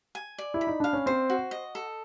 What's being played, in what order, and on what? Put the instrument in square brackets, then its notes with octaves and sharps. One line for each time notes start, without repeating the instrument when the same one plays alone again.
[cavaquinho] G#5
D5
[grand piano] E4
[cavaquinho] B5
[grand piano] D#4
[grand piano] D4 [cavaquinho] F5
[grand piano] C#4
[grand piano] C4 [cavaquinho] C5
[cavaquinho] F#4
D#5
A4